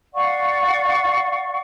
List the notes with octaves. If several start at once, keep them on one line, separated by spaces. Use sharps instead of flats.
D5 F5 F#5 C#6